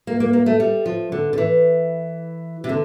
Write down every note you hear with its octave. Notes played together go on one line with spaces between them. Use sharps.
A#3
A#3
A#3
A3
G3
F3
D3
D3
E3
C3
D3